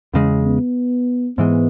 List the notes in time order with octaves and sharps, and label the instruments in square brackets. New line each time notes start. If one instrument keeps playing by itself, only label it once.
[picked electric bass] E2 C#3 G#3 [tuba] C#4
[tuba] B3
[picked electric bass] G#2 E3 G#3 [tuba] B3